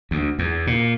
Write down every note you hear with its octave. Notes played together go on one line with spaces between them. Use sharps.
D2
E2
A#2